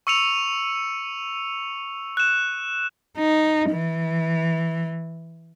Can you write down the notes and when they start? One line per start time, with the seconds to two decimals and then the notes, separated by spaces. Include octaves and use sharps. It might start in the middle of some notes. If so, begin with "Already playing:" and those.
0.07 C#6 E6 C#7 D#7 F7
2.17 F#6 E7
3.18 D#4
3.71 E3